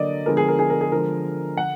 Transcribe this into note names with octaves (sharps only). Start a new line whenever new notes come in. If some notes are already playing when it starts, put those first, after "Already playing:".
Already playing: D3 F#3 A#3 D5 D#5
D3 F3 G#3 B3 A#4
G#4
A#4
G#4
A#4
G#4
D3 F3 G#3 A#4
D3 F#5